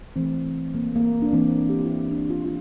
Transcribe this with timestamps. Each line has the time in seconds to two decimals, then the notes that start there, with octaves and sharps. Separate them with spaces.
0.16 E3 A3 C4
0.75 A#3
0.96 A#3
1.22 D4
1.33 E3 A#3 C4
1.69 G4
1.78 F4
1.84 E4
1.92 D4
2.11 D4
2.30 F4
2.45 F4